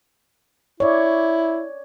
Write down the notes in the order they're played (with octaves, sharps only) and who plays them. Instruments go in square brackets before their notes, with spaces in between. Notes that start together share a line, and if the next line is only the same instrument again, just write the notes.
[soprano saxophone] E4 [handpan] C#5 D5